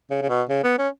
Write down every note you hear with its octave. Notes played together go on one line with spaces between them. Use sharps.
C#3
C#3
B2
C#3
B3
C#4